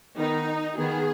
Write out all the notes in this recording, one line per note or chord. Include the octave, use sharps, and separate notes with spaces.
D#3 B3 D#4
D#3 B3 G#4